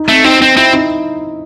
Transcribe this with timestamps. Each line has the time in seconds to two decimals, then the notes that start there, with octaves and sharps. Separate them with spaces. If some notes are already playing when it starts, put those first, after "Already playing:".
Already playing: D#4
0.08 A3 C4
0.24 C4 D#4
0.41 C4 D#4
0.57 C4 E4
0.73 D#4